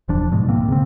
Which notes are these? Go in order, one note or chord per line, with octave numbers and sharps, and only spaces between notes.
E1 F3 D4
G#2 B2 F3 G#3
D2 A#3 C4
C#3 C4